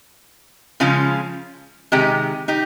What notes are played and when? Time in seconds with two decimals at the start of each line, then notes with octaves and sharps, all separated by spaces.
0.80 C#3 F3 G#3 C#4 F4
1.92 C3 D#3 G#3 D#4 G4
2.48 D#4 G4